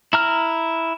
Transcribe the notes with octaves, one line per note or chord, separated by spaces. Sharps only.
E4 A#5 F6